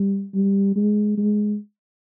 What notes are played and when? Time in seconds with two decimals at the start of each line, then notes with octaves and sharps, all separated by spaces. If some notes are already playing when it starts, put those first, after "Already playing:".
Already playing: G3
0.35 G3
0.76 G#3
1.18 G#3